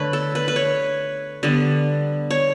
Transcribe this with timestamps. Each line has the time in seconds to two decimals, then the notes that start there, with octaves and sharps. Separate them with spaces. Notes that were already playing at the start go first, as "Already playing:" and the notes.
Already playing: D3 A3 B4 C#5
0.13 A4
0.35 B4
0.48 B4
0.56 C#5
1.43 D3 G3 B3
2.31 C#5